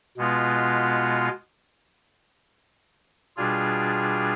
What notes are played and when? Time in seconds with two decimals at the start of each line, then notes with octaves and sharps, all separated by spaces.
0.17 B2 G#3 B3 F4
3.37 B2 G3 D4 F4 G#4